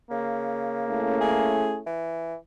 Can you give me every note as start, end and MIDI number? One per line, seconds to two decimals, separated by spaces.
0.11 1.20 49
0.11 1.64 58
0.90 1.83 57
0.90 1.83 61
0.90 1.83 64
1.21 1.75 68
1.86 2.36 52